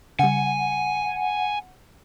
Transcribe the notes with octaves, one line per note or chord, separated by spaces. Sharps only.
C#3 G3 F#5 G#5